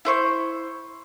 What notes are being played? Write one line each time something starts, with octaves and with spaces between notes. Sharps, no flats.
E4 C5 C#6